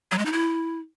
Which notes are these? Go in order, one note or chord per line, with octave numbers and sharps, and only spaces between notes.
F#3
G#3
D#4
E4